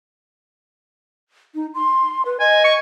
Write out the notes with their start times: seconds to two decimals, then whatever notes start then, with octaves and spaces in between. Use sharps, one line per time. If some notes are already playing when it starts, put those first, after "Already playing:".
1.55 D#4
1.74 C6
2.25 B4
2.40 D#5 G#5
2.64 C#6